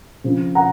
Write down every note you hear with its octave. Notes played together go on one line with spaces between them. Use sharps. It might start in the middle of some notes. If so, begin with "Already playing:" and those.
C#3 F3 C4
F#5 A#5